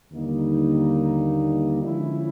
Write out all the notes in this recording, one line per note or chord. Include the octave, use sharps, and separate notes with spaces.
D#2 D3 G3 A#3 D#4
D3 F3 G#3 C#4 E4